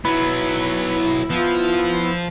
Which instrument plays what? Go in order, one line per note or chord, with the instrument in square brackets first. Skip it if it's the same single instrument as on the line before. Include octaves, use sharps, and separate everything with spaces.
[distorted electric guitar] F#3 B3 [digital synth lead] E4 [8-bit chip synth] B4
[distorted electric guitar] F3 [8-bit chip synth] B3 [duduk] F4